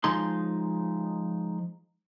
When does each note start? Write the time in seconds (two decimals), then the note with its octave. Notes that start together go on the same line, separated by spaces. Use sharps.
0.04 F3 G#3 D#4 C6